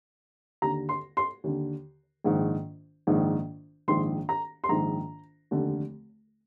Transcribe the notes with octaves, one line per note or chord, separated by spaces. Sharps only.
D#2 D3 A#5
C6
C6
D#2 D3
A#1 G#2 D#3
A#1 G#2 D#3
A#1 G#2 D#3 C6
A#5
C6
A#1 G#2 D#3 A#5
F1 D#2 D3